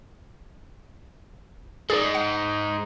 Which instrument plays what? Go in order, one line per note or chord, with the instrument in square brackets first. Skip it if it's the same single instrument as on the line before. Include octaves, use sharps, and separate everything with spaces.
[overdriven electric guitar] G#3 D#4 [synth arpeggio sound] G#4 D5
[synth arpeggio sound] F#5